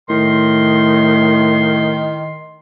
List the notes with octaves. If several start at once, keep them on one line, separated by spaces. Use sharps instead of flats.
A2 D#3 C6